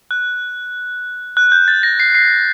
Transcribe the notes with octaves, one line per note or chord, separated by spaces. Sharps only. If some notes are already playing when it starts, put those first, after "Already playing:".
F#6
F#6
G6
A6
A#6
C7
C7